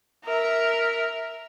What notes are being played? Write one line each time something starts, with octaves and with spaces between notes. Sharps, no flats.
A#4 E5